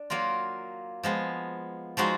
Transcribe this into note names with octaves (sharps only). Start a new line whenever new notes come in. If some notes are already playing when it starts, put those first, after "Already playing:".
Already playing: D4
F#3 A#3 F4 A#4
F3 G#3 B3
F3 G#3 D#4 F#4